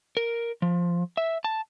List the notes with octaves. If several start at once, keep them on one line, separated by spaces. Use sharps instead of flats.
A#4
F3
E5
A5